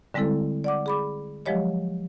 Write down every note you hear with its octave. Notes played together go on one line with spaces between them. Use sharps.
D3 G3 G#3 C4 E4 A4
D5 F#5 D6
G#4 B5 D6
F3 F#3 G#3 G4 C#5 D#5